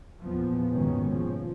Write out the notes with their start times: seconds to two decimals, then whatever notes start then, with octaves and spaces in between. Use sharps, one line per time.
0.24 E2 A#2 F3 B3
0.72 D#2 G#2 B2 D#3 G#3 C#4
1.10 F3